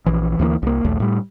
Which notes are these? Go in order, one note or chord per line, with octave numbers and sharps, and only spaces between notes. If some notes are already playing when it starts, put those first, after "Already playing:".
A#1 E3
D2 E3 A3 A#3
C2 A#3
A#1 D#2 A3
A2 G3